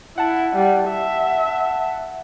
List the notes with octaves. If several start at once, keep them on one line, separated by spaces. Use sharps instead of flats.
E4 F#5 A5
G3
E5